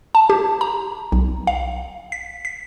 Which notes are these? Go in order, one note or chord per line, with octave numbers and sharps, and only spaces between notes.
A5
G4
A#5
B1
F5
B6
B6